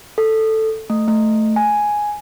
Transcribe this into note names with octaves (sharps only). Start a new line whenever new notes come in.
A4
A3
A3
G#5